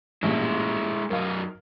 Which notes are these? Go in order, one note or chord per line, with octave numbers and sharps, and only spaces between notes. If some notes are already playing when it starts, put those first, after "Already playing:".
A1 G2 A#2 G#3 E4
F#2 D#4 A#4 F5